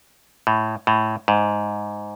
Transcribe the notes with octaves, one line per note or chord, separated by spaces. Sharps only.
A2
A2
G#2